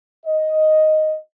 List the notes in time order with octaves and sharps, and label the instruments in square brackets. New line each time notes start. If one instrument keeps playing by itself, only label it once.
[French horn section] D#5